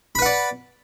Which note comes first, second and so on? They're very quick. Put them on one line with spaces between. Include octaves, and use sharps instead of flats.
B5 B4 F#5 D5